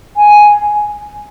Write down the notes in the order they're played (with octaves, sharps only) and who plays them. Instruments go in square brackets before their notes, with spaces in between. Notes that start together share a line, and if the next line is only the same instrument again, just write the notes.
[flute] G#5